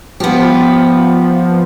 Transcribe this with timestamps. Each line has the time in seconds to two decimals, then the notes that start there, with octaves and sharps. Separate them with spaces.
0.20 F3 B3 G4